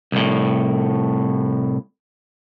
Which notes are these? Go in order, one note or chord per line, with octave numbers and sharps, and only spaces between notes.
C2 A2